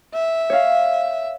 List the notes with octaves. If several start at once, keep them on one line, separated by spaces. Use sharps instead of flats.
E5
C#5 F5